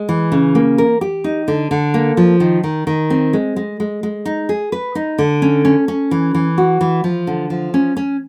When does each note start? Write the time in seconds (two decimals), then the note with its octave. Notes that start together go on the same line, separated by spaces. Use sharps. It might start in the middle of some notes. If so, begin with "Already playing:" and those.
Already playing: G#3
0.09 E3
0.32 C#3
0.55 A#3
0.78 A#4
1.01 G4
1.24 D#4
1.48 D3
1.71 D3
1.94 A#3
2.17 F3
2.40 D#3
2.64 D#3
2.87 D#3
3.10 C4
3.33 G#3
3.56 G#3
3.80 G#3
4.03 G#3
4.25 D#4
4.49 G#4
4.72 B4
4.95 D#4
5.18 D3
5.42 C#4
5.65 C#4
5.88 C#4
6.11 E3
6.34 E3
6.58 F#4
6.81 E3
7.04 F3
7.27 D3
7.50 F3
7.74 C#4
7.97 C#4